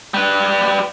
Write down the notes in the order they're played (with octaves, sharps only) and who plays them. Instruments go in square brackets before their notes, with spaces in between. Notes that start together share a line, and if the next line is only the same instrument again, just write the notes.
[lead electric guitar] G3 B4